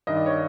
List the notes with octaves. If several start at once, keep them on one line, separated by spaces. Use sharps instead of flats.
G2 D#3 D#5
D5
C#5